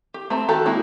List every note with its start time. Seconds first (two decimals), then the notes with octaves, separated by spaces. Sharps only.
0.14 G4
0.30 A3 C4 A#5
0.48 D#3 F#4 G4 A4 A#5
0.65 G#3 A#3 E4 F#4 G#4